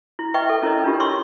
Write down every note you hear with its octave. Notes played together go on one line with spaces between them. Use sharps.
E4
B4 D#5 E5 G5 C#6
A4
C#4 E4 A#4 C#5 D#5
D4 F4 G4
E4 C#5 C6 C#6 E6